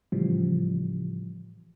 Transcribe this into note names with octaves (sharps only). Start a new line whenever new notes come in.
A2 C#3 E3 F3 G3